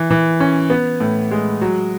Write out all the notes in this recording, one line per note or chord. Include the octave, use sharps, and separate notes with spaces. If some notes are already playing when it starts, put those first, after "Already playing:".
Already playing: E3
E3
C#4
B3
A2
G#3
F#3